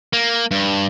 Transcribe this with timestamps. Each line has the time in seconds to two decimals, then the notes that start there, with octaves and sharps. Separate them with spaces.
0.13 A#3
0.51 G2